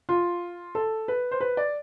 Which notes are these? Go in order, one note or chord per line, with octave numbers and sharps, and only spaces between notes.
F4
A4
B4
C5
B4
D5